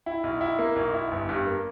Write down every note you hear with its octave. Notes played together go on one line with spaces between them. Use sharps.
E4
B1
E4
A#3
B1
E4
G1
G2
A#3